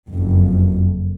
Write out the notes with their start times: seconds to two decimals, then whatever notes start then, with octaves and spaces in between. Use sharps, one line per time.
0.11 F#1 F2